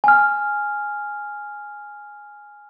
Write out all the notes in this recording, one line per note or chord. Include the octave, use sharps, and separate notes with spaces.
G#5 F6